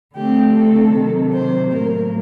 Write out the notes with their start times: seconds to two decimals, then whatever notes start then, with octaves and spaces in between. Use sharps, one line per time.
0.15 D3 A3 C4 G4
0.54 A4
0.93 C3 D#3 F#3
1.33 C5
1.72 A2 F#3 A#3 A#4